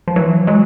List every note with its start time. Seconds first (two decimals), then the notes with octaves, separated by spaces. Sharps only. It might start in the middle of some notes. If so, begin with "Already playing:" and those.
0.08 F3
0.16 E3 F#3
0.47 F#3 G#3